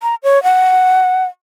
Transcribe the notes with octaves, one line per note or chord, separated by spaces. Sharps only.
A#5
C#5
F#5